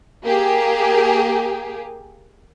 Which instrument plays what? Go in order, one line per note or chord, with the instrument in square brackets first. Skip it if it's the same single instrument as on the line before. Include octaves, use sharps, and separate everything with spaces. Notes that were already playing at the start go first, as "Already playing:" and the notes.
[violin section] A#3 G4 G#4